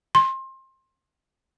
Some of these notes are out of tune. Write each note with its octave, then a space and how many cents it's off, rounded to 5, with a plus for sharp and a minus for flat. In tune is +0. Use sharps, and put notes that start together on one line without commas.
C6 +25